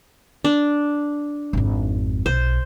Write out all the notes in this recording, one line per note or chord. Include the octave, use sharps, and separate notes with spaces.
D4
G#1 F2
B1 C5